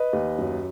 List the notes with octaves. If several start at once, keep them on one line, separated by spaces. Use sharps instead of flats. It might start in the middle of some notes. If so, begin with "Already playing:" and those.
Already playing: B4 D#5
D#2
F#2